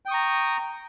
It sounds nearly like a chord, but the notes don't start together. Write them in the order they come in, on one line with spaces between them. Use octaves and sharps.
G5 D#6 C#6 A#5